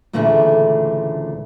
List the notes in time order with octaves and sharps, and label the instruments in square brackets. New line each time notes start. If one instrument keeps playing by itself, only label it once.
[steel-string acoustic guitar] D2 A#2 C#3 E3 A3 D4